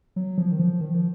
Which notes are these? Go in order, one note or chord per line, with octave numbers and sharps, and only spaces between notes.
F#3
F3
D#3
F3
D#3
F3